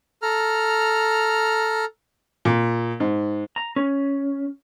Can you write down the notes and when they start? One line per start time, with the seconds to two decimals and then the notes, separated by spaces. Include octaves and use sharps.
0.22 A4 A#5 F6
2.45 A#2
3.00 G#2
3.56 A#5
3.76 C#4